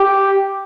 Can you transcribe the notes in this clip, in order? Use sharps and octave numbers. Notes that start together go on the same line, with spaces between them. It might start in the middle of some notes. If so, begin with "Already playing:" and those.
Already playing: G4